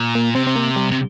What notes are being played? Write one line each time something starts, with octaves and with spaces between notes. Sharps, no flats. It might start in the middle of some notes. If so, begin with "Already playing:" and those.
Already playing: A#2
A#3
C3 C4
C4
A#3
G3
C3